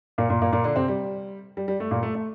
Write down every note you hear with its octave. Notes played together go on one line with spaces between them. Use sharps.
A#2 A#3
A#2 A#3
A#2 A#3
A#2 A#3
D3 D4
C3 C4
G3
G3
G3
A3
A#2 A#3
A3
A3